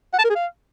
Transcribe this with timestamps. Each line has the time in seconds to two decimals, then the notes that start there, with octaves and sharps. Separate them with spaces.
0.13 F#5
0.19 A5
0.24 A#4
0.30 G#4
0.35 F5